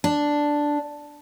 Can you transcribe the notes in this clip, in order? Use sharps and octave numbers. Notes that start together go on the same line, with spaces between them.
D4